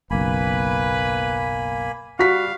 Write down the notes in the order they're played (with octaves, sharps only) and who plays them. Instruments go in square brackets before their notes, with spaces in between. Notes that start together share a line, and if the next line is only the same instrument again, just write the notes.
[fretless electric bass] F#1 B1 [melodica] A#3 G#5 B5 [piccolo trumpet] B4
[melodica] G3 [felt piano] F#4 B6 [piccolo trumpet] F5